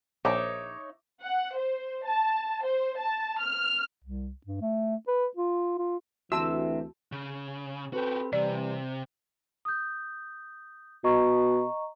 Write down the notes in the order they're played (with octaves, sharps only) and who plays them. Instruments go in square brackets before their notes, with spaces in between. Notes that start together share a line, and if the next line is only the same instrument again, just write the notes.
[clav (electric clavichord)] A#1 [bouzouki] D#4 C#5 E5 [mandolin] D6
[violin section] F#5
C5
A5
C5
A5
F6
[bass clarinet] C2
G2
A3
B4
F4
F4
[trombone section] D2 E3 [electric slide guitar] C4 G4 E5 [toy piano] F#4 A5 [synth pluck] E6
[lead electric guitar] C#3
[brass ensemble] C4 A4 B4 [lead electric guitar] F#4 G4
[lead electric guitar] C3 [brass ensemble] E3 G3 [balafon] D5
[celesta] D#6 G6
[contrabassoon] B2 [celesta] D#5 A#5 C#6